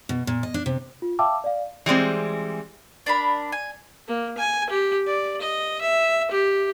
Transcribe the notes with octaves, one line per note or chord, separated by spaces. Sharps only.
B2
A#2
D#5
D4
C3
F4
E5 F5 G5 A5 D6 E6
D5 F5
E3 G3 G#3 C4
D4 A#4 B5
G#5
A#3
G#5
G4
D5
D#5
E5
G4